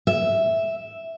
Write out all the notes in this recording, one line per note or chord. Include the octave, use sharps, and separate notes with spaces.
E5